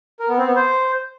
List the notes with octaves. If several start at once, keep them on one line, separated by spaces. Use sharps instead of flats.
A#4
B3
C4
B3
C5